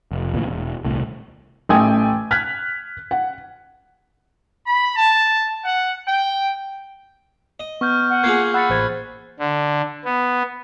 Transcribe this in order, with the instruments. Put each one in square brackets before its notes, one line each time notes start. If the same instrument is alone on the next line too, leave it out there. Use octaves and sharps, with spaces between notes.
[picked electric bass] F1
D2 A#2 E3
E1
D#1 C2 A2
[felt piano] A1 A3 G5 G#5 D#6 G#6
F6 F#6 G#6 B6
F#5
[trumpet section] B5
A5
F#5
G5
[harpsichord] D#5
[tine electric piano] B3 [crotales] C#6 F6 G6
[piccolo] F#5
[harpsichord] A#3 F4 G#4 [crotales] C#6 G#6 C7
[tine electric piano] F#5 E6 [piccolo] B5 [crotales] F#6 A6 C#7
[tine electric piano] A1 C5 G#6
[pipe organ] D3
B3